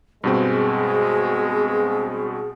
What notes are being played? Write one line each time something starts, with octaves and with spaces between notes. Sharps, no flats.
G2 B2 G#3 C4 G#4